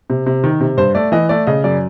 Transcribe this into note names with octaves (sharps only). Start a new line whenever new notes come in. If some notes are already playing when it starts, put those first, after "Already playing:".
C3
C3
D#3
C3
G2 C5
A3 D5
E3 D#5
A3 D5
C#3 D#5
F#2 D5